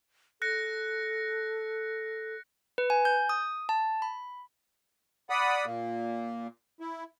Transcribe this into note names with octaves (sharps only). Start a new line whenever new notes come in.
A4 F#6 A#6 C#7
B4
G#5
G6
D#6
A5
B5
D5 F#5 B5 D#6
A#2 A#3
E4